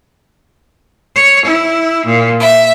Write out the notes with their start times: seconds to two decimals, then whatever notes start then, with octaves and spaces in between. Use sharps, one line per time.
1.15 C#5
1.45 E4
2.05 A#2
2.40 E5